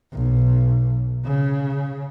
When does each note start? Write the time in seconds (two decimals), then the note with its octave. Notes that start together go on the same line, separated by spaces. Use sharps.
0.13 B1
1.25 C#3